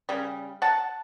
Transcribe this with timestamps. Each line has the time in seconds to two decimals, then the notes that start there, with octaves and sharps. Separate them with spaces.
0.09 C#3 G3
0.62 F#5 A5